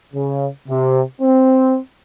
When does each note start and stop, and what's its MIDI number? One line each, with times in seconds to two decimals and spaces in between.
0.14 0.47 49
0.68 1.01 48
1.21 1.77 60